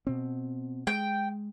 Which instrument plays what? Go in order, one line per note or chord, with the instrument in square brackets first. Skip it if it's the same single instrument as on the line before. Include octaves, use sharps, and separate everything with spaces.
[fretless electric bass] B2 C4
[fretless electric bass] G#3 [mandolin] G5